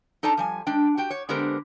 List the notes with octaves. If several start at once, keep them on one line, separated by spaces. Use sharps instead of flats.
D#4 A4 D5 A5 A#5
F3 G3 G#5
G#3 D4 G5
F#4 G4 G5
C#5
D3 G#3 B3 G4 A#4 C5